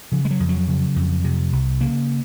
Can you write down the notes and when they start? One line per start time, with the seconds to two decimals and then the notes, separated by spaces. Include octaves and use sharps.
0.12 C#3 F3
0.25 G#3
0.31 F#3
0.40 F2
0.49 F#3
0.68 C#3
0.96 F2
1.24 C3
1.53 C2
1.80 C#3 A#3